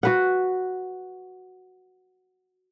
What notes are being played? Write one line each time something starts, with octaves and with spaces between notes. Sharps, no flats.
F#4 B4 F#5